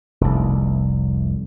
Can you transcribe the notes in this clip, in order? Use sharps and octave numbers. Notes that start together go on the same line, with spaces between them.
F1 C2